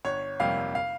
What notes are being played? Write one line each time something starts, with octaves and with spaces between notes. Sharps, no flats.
G1 C#5
F2 C3 G3 A#3 F5
F5